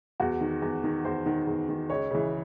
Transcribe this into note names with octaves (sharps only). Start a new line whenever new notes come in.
E2 F#4
D#3
E2
D#3
E2 C5
D#3
E2
D#3
C#2 C#5
C#3 E3